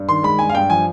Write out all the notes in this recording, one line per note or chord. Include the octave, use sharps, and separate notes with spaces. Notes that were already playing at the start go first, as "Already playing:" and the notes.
Already playing: G2
D#3 C6
G#3 B5
G2 G#5
F5
G2 G5
F3 G#5